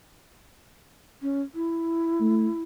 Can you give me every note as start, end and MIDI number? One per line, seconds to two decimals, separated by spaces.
1.22 1.42 61
1.55 2.62 64
2.21 2.48 57